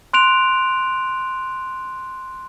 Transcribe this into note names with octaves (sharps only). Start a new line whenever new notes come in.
C6 F#6 D7 F7